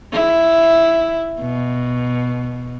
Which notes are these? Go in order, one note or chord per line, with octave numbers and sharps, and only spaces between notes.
E4
B2